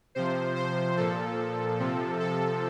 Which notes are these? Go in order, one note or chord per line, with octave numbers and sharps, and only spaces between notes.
C3 F3 C5
C5
A#2 F3 A4
C3 F3
A4